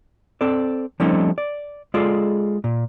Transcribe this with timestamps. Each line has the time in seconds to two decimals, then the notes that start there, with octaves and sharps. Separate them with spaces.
0.41 C4 A4 D5
1.00 F3 G3 A3 C4 C#4 D#4
1.38 D5
1.94 G#3 F4 G#4 A4 D5
2.64 A#2